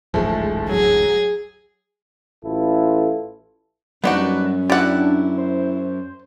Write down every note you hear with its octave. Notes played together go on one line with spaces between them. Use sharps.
D1 A1 G#2 F3 G#3 A3
F#3 G#4
A1 E4 F4 A4 B4
F#2 G3 A#3 B3 D4 D#4 F#4
D4 E4 F#4 G4 D5 F#5
C5